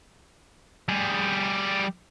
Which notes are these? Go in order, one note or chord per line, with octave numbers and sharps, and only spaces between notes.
G3 G#4